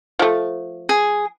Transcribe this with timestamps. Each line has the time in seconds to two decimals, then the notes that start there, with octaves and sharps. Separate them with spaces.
0.19 F3 A3
0.89 G#4